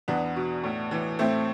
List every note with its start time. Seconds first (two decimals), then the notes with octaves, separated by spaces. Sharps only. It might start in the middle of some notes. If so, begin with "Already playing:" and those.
0.08 E2 B3 D4
0.36 B2
0.64 A2
0.91 E3
1.19 A2 A3 C4